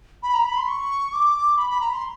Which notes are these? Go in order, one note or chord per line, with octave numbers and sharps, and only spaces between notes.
B5
A#5
B5
C6
C#6
D6
B5
B5
A#5
C6